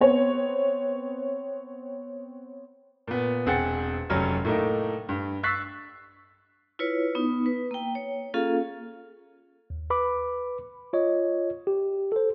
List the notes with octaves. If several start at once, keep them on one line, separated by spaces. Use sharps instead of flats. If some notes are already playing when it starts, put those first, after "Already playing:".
B3 C4 C#5
A#2 B3
E1 C4 G#4 F#5 A6 C#7
F1 F#3 G3 C#4 F6
A2 A3 A#3 D#4
G2
C#6 E6 F#6 A6 B6 C7
E4 F4 B4 C#5
B3 D#4
B4
A#3 G5
C#5
A#3 C#4 F4 G#4 A4 F5
D#2
B4 B5 D6
F4 C#5 D#5
G4
A4 C5